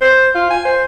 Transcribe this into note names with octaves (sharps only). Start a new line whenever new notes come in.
C5
F4
G#5
C5